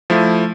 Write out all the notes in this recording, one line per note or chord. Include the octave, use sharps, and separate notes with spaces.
F3 A3 E4